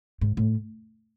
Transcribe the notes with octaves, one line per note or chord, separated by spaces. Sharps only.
G#2
A2